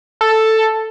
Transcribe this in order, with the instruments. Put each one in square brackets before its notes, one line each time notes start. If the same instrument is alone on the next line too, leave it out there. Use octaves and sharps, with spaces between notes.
[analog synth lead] A4